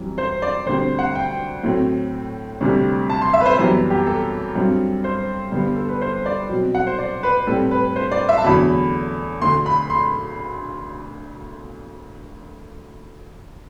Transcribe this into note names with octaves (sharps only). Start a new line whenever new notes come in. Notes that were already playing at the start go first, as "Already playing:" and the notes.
Already playing: F#2 E3 G3 C4
C5
D5
D2 D3 G3 C4 C5
F#5
G5
A2 F#3 A3 C4
D2 C3 G3
A5
C6
E5
B4
C5
F#2 E3 G3 B3
G4
A4
G2 F#3 C4
C5
G2 D3 G3 B3
A4
B4
C5
D5
B2 F#3 C4
F#5
C5
D5
B4
A2 G3 C4 A4
B4
C5
D5
E5
A5
E2 D3 F#3 A3 B5
D2 D3 A3 C6
B5
C6